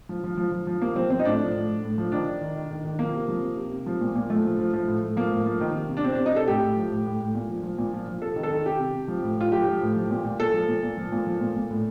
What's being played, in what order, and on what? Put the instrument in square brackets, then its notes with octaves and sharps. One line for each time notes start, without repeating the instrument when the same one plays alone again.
[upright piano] F3
F3
F3
F3
F3
C3 A#3
F3 C4
F3 C4
D#4
A2 D4
F3
A2
A2
A2
F3
D#3 D4
D#3
D#3
D#3
D#3
D#3
F3 A#3
C3
F3
C3
C3
C3
F3
A#2
A#2
F3 A3
F3
F3
F3
A2
A2
F3 A#3
A2
F3
D#3
C3
C3
D4
C3 C4
C3 D4
D#4
C3 A4
A2 G4
A2
F3
A2
A2
A2
A#2
F3
F3
A#2
F3
F3
C3 A4
D#3
A4
D#3
C3 G4
C3
C3
F3
A2
A2 F4
F3 G4
F3
A2
F3
A#2
A#2
A#2 A4
F3
A#2
A#2
F3
A#2
F3
A#2
A#2
A2